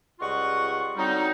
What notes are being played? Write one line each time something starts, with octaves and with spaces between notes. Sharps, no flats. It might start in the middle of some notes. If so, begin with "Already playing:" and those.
C#2 G3 F4 D#5 F#5 C#6
D3 F#3 G3 C4 D#4